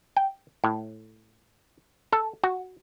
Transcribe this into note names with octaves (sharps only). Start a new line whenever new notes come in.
G5
A2
A4
F#4